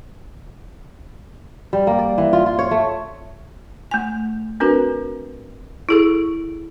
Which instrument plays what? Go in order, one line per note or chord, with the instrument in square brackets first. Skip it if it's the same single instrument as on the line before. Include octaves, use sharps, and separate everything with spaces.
[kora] G3
A#3
D5
E3
F4
F4
C#5
A3
[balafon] A3 G#5
C4 D4 F#4 A#4 B4
E4 G#4 A4